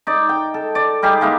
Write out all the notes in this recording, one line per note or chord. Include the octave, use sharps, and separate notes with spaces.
D#4 D5
G5
A4
D5
G3 D#4 G4 G#4
G#3 A#3 D#4 E4